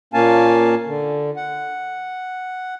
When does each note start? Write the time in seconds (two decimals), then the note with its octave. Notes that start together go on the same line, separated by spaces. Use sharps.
0.14 A#2 A#3 C#4 F5 G#5 A5
0.87 D3
1.37 F#5